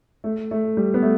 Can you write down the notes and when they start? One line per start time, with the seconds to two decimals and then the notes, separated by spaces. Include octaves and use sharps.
0.24 A3
0.51 A3
0.77 G3
0.94 B3
1.02 A3